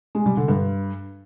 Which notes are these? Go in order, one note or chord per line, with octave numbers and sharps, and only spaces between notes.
G#3
G3
D3
G2